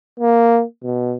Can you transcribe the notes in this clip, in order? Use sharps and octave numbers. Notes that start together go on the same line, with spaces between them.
A#3
B2